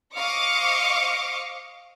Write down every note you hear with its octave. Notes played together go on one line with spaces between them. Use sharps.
C5 D#5 F5 C#6 D6